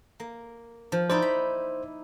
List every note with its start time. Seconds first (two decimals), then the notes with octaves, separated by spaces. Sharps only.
0.20 A#3
0.92 F3
1.10 D#4 E4 C5 D5
1.22 B5